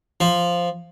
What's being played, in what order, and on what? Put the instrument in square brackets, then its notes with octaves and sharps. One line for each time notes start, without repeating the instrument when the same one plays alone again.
[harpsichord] F3